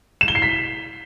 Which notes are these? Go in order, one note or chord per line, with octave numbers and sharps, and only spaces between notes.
E7
G7
C7
B6